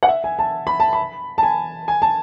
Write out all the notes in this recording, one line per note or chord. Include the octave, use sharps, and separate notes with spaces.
F#5
E5
G#5
A5
B5
A5
B5
A5
G#5
G#5
A5